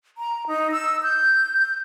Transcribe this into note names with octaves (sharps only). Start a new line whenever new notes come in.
A#5
D#4
E6
G6